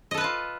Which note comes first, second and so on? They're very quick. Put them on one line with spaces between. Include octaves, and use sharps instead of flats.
D#5 A4 B4 A5 F4